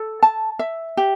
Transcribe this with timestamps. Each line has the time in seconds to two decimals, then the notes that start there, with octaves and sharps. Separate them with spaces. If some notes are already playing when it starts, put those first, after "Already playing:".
Already playing: A4
0.23 A5
0.59 E5
0.97 G4